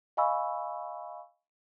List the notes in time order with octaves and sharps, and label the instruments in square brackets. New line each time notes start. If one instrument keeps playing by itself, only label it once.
[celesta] D#5 F5 G#5 B5 C#6 E6